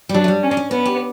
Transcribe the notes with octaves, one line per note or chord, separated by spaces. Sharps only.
G3
F#3 D4
A3
G3
C#4
D4
C#4
B3 C#4
G4